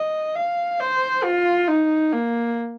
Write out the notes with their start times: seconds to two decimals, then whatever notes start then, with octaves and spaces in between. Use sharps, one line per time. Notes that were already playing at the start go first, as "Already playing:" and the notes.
Already playing: D#5
0.35 F5
0.80 C5
1.23 F4
1.67 D#4
2.12 A#3